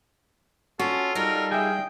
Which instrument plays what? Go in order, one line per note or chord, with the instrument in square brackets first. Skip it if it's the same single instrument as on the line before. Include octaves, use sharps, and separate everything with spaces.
[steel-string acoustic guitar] C#4 [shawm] F4 [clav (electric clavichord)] F#4 [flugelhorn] A4
[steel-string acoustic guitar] G3 D#4 F4 [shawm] A#4
[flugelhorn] G#4 [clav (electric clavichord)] E5 G#5 [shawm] G5